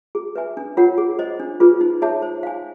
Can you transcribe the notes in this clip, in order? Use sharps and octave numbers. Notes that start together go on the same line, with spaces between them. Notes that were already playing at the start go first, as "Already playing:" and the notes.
G#4
B4 E5 G#5
D4
F4 A#4 C#5 F#5
G#4
C5 D#5
D4
F4 G#4 B4
D#4
G#4 C#5 E5 A5
C5
F5 G#5